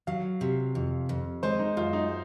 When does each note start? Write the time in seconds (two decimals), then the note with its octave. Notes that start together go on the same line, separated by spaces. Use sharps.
0.07 F#3 F5
0.41 C3
0.75 F2
1.09 F2
1.43 G#3 C5
1.59 D#4
1.77 F#2 F4
1.93 D#4